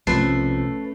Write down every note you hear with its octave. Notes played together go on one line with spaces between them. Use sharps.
B1 C3 F3 A3 C#4 B4 A5 C7